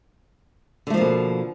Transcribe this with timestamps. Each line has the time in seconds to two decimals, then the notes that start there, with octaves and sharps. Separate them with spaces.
0.87 D3
0.90 A3
0.94 F3
0.97 A#3
1.01 B2